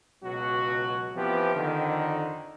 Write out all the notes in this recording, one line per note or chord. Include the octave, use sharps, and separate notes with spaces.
C#2 B2 F#3 F#4
E3 F3 B3 C4 G4
F2 D3 D#3